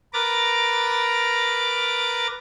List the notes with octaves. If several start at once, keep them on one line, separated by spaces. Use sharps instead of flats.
A#4 B4 A#5 D6 A6